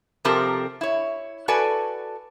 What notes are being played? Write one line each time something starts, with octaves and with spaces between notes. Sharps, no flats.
C3 F3 C4 G4 A4 A#4
E4 C#5
F#4 A4 B4 D5 G#5